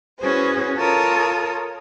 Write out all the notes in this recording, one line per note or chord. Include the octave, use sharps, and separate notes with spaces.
C#4 E4 F#4 G#4 B4 C5
F4 A4 A#4 C#5 D#6